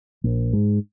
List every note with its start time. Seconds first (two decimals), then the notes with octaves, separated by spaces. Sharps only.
0.24 A#1
0.53 G#2